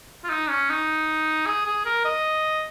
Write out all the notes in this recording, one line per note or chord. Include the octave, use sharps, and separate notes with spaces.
F4
D#4
C#4
D#4
G#4
G#4
A#4
D#5